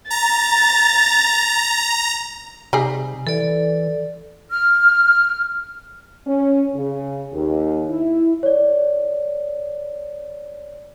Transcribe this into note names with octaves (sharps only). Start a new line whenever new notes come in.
A#5 A6
C3 G3 D#4 G#4
E3 A4 D5
F6
C#4
C#3
D#2
E4
C#5 D5